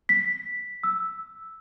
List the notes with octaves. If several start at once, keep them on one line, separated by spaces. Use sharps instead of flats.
B6
E6